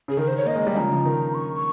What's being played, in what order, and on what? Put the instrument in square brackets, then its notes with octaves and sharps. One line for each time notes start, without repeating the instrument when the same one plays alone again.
[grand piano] C#3 [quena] G#4
[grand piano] D#3 [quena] A#4
[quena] C5
C#5
[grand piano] A#3 [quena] D#5
[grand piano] G#3
[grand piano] G3 [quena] D#5
[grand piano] C#3 F3 [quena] A#5
[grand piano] C#3 F3
D#3
[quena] C#6
C#6